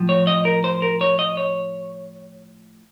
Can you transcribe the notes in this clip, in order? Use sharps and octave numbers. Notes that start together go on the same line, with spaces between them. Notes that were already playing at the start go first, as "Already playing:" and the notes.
Already playing: A2 F3
C#5
D#5
A#4
C5
A#4
C#5
D#5
C#5